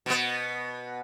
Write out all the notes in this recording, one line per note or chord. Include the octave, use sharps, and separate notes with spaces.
B2 B3